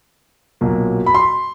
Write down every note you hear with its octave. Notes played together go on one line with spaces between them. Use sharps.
B1 A#2 F#3 A#3
B5
C6